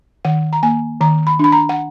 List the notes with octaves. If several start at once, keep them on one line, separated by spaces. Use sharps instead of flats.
D#3 F#5
A#5
A#3 G#5
D#3 A#5
B5
D4 B5
A#5
F#5